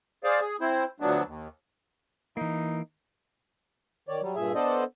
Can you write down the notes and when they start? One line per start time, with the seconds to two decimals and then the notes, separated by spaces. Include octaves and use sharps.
0.24 G#4 C5 D5 F5
0.41 G#4
0.61 C4 E4 C5
1.00 D2 F3 F#3 B3 D4
1.25 D#2
2.37 E3 A#3 D#4
4.09 D#3 C#5 D5
4.22 F#3 G3
4.35 G2 A#2 G#4 E5
4.55 B3 D4 A4 C5 D5 D#5